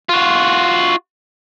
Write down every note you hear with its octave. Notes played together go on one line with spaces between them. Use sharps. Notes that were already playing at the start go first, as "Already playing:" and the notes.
F4 F#4